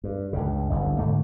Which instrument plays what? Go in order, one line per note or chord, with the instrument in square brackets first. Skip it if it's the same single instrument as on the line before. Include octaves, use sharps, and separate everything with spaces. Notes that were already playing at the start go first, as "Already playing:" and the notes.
[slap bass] G2
C#2 G2 C#3
G1 C2 G2
G#2 D3 A3 A#3